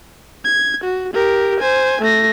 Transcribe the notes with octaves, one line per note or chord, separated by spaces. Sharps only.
G#6
F#4
G4 A#4
C5 G#5
A3 A#6